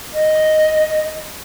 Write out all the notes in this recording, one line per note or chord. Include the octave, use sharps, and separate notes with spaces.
D#5